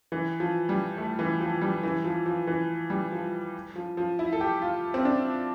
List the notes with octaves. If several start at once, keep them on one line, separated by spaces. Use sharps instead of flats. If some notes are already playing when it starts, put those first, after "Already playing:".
E3
F3
G3
A3
E3
F3
G3
E3
F3
F3
E3
G3
F3
F3
F3
E4
A4
G4
F4
C4
D4